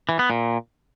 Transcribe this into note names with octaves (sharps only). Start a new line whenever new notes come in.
E3
B3
A#2